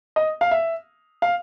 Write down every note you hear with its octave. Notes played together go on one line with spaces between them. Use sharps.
D#5
F5
E5
F5